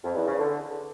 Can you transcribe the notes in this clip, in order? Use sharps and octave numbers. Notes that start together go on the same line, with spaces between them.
F2
E2
C#3
D3